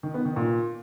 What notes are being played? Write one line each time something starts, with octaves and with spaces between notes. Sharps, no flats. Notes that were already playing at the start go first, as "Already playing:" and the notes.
D#3
B3
D#3
A#2